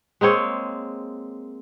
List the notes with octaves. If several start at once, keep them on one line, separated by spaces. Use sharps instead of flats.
G#3 A#3 C4 C#5